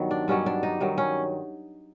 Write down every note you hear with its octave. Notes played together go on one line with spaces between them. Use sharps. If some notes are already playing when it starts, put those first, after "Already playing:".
Already playing: G2 D#3 F#3 B3
D4
G2 D#3 F#3 C#4
D4
D#4
G2 D#3 F#3
C#4